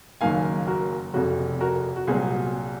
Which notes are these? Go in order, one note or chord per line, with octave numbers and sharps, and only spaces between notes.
F#1 F#2 D#3 A#3 F5 G#5
F#4 A#4
F1 F2 C#3 F#4
F#4 A#4
F#4
C2 A#2 F#3 C4 G#4